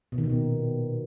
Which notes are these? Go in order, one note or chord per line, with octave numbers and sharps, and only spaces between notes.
B2
D#3
B2
A#2